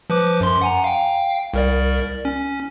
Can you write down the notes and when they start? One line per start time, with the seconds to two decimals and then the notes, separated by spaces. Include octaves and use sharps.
0.10 F3 B4 D6
0.41 F#2 C6
0.61 F#5 G#5 A#5
0.84 F5 G5
1.54 C2 A#4 D5
2.25 C#4